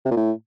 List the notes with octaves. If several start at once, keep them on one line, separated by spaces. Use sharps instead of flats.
C3
A#2
A2